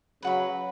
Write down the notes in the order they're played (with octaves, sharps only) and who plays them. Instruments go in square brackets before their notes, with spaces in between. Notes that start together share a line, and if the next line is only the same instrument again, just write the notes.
[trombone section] C#3 F#3 [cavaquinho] B4 F#5 B5